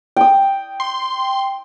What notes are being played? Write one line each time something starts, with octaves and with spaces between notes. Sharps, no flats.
G5 D#6
C6